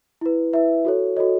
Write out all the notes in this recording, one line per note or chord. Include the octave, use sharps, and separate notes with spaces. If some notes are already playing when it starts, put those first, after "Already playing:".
E4 B4
E4 B4 E5
F#4 A4 C#5
F#4 A4 C#5 D#5